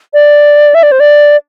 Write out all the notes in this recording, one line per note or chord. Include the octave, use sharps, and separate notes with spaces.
D5
E5
D5
C5
D5